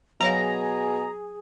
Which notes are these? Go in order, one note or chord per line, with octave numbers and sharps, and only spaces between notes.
B2 F#3 G#4 C#5 F5 A#5